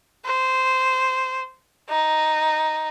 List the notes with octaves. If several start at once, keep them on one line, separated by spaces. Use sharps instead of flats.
C5
D#4